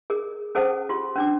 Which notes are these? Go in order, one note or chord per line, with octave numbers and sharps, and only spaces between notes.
G#4 A#4
C#4 G#4 A4 C5 F#5 A5
F4 G4 C6
C#4 D4 D6